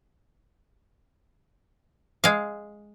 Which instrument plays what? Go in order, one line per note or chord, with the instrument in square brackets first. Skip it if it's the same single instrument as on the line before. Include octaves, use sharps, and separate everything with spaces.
[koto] G#3 F5